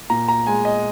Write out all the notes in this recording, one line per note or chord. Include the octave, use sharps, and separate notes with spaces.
A#2 A#5
A#5
G#3 G#5
D#5